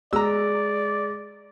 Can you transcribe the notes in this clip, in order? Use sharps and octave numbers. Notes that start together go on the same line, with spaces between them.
G#3 D5 A#5 E6